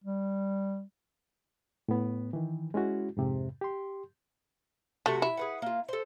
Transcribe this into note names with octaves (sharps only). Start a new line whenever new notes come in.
G3
A2 B3
D#3 E3
G#3 C#4 E4 F#4
F2 G#2 C3
G4 C6
C3 F#3 A3 F#4
E4
G#4 B4 F#5
A#3 F4
A4 C5